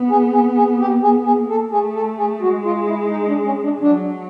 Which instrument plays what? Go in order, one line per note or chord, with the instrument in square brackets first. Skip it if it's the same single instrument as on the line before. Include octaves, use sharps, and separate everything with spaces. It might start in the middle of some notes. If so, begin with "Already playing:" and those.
Already playing: [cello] B3
[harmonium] G#4
G#4
G#4
G4
[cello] B3 [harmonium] G#4
[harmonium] G#4
[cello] A#3
[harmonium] A4
[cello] A3 [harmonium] G#4
[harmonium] A4
G#4
[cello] G#3 [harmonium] F#4
[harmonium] F4
E4
D#4
D4
C#4
D4
[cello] F#3 [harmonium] D4